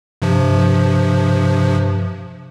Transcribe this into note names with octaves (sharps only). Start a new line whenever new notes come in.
G2 C3 F3